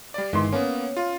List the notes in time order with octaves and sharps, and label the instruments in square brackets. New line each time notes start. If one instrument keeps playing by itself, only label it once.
[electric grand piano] G3 D5
[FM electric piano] G1 D#3 C6 [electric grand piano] E3 G#3
[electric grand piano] A#3 B3 [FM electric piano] C#4
[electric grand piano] F4